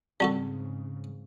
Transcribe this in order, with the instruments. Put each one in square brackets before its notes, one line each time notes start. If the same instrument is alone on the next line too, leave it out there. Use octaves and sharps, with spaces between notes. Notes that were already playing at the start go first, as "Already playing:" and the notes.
[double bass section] G#2 C#3 [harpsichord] G3 F#4 A4 [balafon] C4